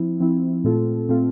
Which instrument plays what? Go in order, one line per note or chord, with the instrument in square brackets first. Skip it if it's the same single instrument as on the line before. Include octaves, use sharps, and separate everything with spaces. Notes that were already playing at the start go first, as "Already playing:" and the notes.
Already playing: [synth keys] F3 C4 E4
F3 C4 E4
A#2 A3 C4 F4 A4
A#2 A3 C4 F4 A4